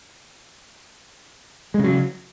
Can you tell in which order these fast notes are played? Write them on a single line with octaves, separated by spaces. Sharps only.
G#3 C#3 F#3